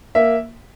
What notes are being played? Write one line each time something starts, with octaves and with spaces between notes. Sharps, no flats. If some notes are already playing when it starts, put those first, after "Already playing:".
A#3 E5